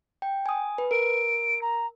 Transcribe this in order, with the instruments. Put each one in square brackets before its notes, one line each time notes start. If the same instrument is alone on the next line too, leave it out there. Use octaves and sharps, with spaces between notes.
[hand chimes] G5
G#5 D#6
B4
[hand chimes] A#4 [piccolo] D7
[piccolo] A#5